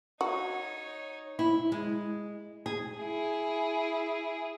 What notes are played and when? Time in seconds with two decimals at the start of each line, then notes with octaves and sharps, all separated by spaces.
0.21 D#4 F#4 C#5
1.39 E4
1.72 G#3
2.66 G#4
2.98 E4 G#4